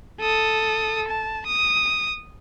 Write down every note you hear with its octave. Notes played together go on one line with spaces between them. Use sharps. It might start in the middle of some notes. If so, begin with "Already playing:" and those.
A4 D#6
A5
D#6